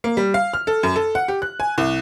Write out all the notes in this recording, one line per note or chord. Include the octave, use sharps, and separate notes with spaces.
A#3
G3
F5
F6
A4
F#2
A4
F#5
G4
F#6
G#5
C2